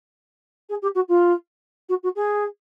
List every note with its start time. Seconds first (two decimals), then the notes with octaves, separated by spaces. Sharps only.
0.69 G#4
0.82 G4
0.95 F#4
1.08 F4
1.89 F#4
2.03 F#4
2.15 G#4